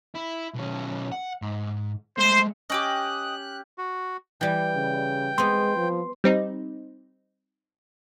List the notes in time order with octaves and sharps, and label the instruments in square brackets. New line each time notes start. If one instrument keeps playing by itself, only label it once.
[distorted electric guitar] E4
B1 C#4
F#5
G#2
[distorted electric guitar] G#3 A3 [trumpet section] C5
[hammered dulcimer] C#4 G4 [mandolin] D#5 G5 D6 [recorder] D#6 [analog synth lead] F#6
[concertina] F#4
[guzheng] E3 G3 [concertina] G5
[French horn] C#3
[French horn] G#3 [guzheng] B3 C4 [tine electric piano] C6
[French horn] F3
[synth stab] G3 C4 D#4